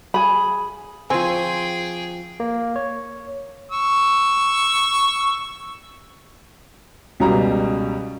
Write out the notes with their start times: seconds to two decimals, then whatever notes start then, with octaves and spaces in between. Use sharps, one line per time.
0.14 G#4 B5
1.10 F3 C4 G#4 G5 G#5 C#6
2.40 A#3
2.76 C#5
3.72 C#6 E6
7.20 C#2 B2 G3 A#5